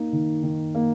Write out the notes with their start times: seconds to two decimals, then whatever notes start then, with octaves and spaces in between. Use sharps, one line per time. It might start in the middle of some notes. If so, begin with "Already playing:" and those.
Already playing: A#3 D#4
0.13 D#3
0.43 D#3
0.75 A#3